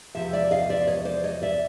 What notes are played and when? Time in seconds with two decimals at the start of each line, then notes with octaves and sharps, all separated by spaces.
0.15 E2 C3 F3 E5
0.33 D5 E5
0.51 D#5 F5
0.69 D5 E5
0.87 C#5 D#5
1.05 C5 D5
1.24 C#5 D#5
1.42 D5 E5